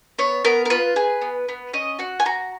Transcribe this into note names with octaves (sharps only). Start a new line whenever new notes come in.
B3 C#5
B3 A#4
A#4
F4 B4
G#4
B3
B3
C#4 D#5
F#4 F#5
G#5
F#4 A#5